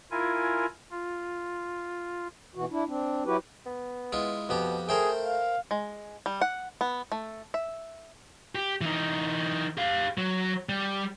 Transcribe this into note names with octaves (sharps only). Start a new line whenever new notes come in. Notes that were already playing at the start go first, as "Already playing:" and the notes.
E4 F4 A#4 G#5
F4
B2 E3 F#4
D4 E4
C4 D4
F#3 E4 F#4 G4 B4
B3
G#3 E4 F4
F2 B2 B3 G4
A3 G#4 A#4 C5 G5
F5
G#3
G3
F#5
B3
A3
E5
G4
E3 D#4
G4 F5
F#3
G3